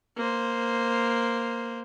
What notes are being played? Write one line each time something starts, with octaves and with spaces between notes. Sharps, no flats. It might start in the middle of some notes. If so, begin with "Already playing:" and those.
A#3 C5